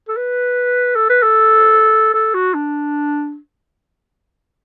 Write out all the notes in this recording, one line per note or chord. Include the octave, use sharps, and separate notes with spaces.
A4
B4
A4
B4
A4
A4
F#4
D4